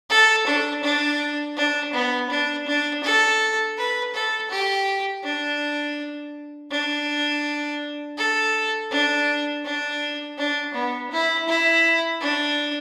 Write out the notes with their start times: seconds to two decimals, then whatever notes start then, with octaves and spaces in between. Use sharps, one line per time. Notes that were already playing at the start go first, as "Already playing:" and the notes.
0.10 A4
0.46 D4
0.83 D4
1.57 D4
1.93 B3
2.30 D4
2.67 D4
3.03 A4
3.77 B4
4.14 A4
4.50 G4
5.24 D4
6.71 D4
8.17 A4
8.91 D4
9.64 D4
10.38 D4
10.74 B3
11.11 E4
11.48 E4
12.21 D4